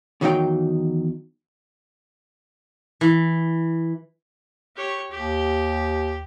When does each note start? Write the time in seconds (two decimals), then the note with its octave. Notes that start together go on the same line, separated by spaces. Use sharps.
0.21 E2 D#3 F#3 D#4 F5 G5
3.01 E3
4.76 G4 C#5
5.11 D#2 G4